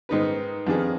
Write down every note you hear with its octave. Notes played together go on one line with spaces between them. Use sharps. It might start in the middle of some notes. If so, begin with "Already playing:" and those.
G#2 D#3 B3 D#4 B4
F2 D#3 B3 D4 G#4